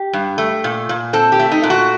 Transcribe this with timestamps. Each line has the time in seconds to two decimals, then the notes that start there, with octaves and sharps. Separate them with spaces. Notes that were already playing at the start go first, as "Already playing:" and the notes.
Already playing: G4
0.13 G2
0.38 A3
0.64 A#2
0.89 A#2
1.13 C4 A4
1.32 G4
1.39 A3
1.52 D#4
1.63 A#2
1.70 F#4